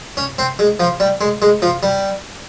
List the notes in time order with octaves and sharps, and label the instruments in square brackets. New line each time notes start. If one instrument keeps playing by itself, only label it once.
[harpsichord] C#4
C4
G#3
F3
G3
G#3
G#3
F3
G3